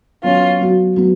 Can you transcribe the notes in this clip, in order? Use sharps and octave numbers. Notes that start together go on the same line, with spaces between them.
F#3 B3 C#4 F4 F#4
F#3 B3 F#4
F#3 B3 F#4